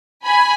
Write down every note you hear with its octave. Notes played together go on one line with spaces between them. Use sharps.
G#5 B5